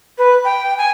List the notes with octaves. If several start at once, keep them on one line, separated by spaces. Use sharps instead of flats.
B4
G5
G#5